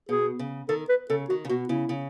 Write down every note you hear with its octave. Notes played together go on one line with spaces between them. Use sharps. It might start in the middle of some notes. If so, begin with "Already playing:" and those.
B2 G#4
C#3
D#3 A4
B4
C#3 A4
D#3 F#4
C#3
B2 F#4
C#3 E4
C#3